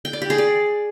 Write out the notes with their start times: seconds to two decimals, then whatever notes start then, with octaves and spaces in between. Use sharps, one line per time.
0.05 G5
0.13 D5
0.22 G4
0.30 G#4
0.38 D5